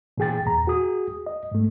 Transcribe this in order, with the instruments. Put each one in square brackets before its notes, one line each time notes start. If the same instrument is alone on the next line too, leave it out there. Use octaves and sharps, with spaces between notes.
[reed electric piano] A#2 E3 G#4 G5 A6
E2 A#2 A#5
F#4 G#4 D#6
D#5
G#2 A3